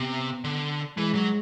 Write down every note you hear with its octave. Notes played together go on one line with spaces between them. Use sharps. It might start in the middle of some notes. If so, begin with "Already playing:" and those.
Already playing: C3 B3
D3
E3 G#3
F#3